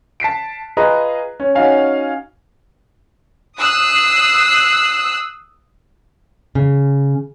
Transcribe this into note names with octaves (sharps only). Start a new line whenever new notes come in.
A5 B6 C7 D7
F4 G#4 B4 D#5 A#5
C#4
C#4 D#4 F#4 F5 G#5
D#6 E6 F#6 C7
C#3